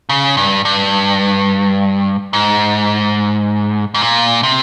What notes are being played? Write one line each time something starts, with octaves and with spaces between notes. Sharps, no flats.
C#3
G2
G2
G#2
G#2
A#2
C3